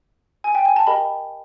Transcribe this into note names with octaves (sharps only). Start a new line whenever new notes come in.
G#5
G5
G#5
A5
G4 A#4 D#5 G5 B5